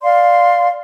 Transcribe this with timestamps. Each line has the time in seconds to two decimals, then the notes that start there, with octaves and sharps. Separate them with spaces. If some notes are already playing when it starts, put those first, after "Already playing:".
0.02 D5 F5 C6